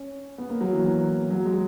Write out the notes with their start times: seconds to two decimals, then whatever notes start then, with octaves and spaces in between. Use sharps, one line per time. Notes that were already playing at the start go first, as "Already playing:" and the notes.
Already playing: C#4
0.38 B3
0.50 A#3
0.61 F#3
0.73 E3
0.84 E3
1.30 F#3
1.45 G#3